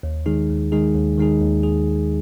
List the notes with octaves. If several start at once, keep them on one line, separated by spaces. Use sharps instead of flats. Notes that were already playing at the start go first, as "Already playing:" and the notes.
D#2
D#3 G#3 D#4 G#4
D#2
D#3 G#3 D#4 G#4
D#2
D#3 G#3 D#4 G#4
D#2
G#4